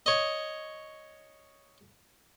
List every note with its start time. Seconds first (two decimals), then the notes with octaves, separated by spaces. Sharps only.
0.06 C#5 D#5